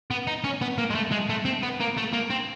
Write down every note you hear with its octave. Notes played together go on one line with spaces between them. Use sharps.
B3
D#4
C#4
B3
A#3
G#3
A3
G#3
A3
C4
B3
A#3
A3
A#3
C4